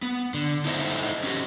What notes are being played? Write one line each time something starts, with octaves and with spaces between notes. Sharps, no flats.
B3
D3
D#4 E4 A4 C5 D#5
C#4 F#4 G4